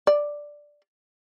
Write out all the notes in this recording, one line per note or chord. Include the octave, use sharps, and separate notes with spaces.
D5